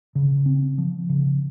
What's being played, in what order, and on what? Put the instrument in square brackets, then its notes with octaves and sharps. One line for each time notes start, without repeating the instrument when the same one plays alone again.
[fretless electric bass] C#3
C4
F3
C#3